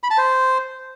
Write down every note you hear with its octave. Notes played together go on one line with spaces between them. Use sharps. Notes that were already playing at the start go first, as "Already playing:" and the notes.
B5
A5
C5